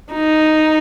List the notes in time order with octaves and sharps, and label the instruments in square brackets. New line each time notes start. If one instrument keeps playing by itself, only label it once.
[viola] D#4